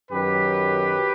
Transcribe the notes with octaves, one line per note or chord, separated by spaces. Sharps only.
F#2 D#3 F#3 G4 B4